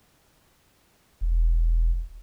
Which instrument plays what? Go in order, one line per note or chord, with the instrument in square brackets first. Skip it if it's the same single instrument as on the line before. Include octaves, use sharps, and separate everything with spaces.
[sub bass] E1